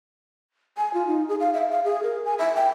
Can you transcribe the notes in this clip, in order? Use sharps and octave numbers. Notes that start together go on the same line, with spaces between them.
G#5
F4
D#4
G#4
F5
E5
F5
G#4
A#4
G#5
E5
G5